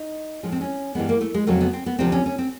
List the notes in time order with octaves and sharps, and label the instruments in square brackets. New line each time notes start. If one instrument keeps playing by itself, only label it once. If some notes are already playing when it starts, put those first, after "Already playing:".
Already playing: [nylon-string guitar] D#4
A2 F3 G#3 C#4
C4
C#4
G2 E3 G#3 B3
A#3
A3
G#3
F2 C#3 F#3 A3
B3
C4
B3
D2 C3 F3 C4
C#4
C#4
C4